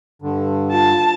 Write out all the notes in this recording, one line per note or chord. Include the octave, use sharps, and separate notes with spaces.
G2 D3
F4 A5